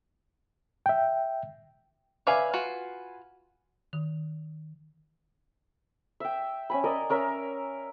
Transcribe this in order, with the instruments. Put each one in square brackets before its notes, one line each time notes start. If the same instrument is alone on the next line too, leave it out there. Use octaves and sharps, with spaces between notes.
[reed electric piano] E5 G5
[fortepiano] B4 F5 G#5 [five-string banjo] C#5 D5 E5
[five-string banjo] F4 F#4
[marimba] D#3
[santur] E5 G5
C#4 G#5 B5
A#4 D5 D#5
C#4 A#4 E5